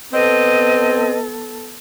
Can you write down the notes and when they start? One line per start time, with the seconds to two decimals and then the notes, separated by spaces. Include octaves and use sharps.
0.13 B3 C4 A4 B4 D#5